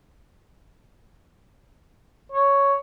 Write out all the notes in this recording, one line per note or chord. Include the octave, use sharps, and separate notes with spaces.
C#5